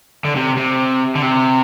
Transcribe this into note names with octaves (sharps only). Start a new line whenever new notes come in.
D3
C3
C3
D3
C3